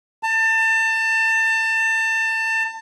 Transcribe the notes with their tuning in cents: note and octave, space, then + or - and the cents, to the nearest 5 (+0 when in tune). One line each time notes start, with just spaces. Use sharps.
A5 +30